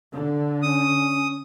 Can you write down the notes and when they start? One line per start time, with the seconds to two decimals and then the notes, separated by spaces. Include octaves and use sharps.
0.13 D3
0.63 C#4 D#6